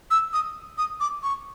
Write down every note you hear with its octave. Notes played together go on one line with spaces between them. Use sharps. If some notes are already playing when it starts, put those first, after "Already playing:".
E6
D#6
D#6
D6
C#6